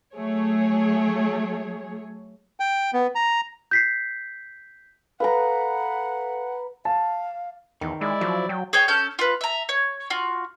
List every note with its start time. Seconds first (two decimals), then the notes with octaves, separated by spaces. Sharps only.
0.14 F#3 A3 G#4 C#5
2.60 G5
2.93 B3
3.15 A#5
3.71 G6 B6 C7
5.20 A4 B4 F5 F#5 A#5
6.85 F5 A5
7.81 E2 D#3
8.01 G#3 E4 D5
8.21 F3 F#3
8.49 F#3 G5
8.73 G#4 C#5 G5
8.88 C#4 A4 F6 G6
9.19 F4 B4
9.41 E5 A#5
9.69 C#5
10.10 F4 F#4